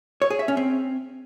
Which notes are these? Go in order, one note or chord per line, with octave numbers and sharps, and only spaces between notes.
C#5
G#4
E5
C#4
C4